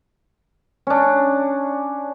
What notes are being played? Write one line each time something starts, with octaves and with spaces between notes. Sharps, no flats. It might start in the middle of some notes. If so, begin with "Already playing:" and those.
C#4 D4